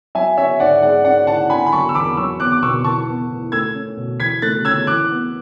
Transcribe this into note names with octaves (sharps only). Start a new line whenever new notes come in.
F#3 E5 G#5
C#4 C#5 E5
G#2 D5 F#5
G#3 D5 F#5
C#4 D5 F#5
A2 F#5 A5
D3 G#5 B5
B5
F#3 A5 C#6
E6
E2 B5 D6
F#3 C#6 E6
B3 D6 F#6
D6
B2 C#6 E6
E3 A5 C#6
B3
A2
A3 E6 G#6
C#4
B2
E3 G#6 B6
A3 F#6 A6
C#4 E6 G#6
E3 D6 F#6
B3